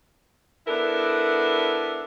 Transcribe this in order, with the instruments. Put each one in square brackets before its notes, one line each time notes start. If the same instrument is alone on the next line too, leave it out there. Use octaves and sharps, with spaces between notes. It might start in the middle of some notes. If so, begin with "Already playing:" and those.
[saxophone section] B3 D4 E4 A4 A#4